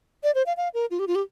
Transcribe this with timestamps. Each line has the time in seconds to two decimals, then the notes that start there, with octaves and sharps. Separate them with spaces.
0.23 D5
0.35 C5
0.46 F5
0.57 F5
0.74 A#4
0.91 F4
0.99 G4
1.07 F4
1.15 G4